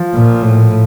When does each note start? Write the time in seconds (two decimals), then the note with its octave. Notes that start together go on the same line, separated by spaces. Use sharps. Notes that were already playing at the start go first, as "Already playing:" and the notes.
Already playing: F3
0.15 A#2
0.43 A2